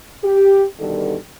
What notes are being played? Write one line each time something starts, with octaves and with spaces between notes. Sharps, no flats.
G4
G2 B2 D3 D#3 G3 A4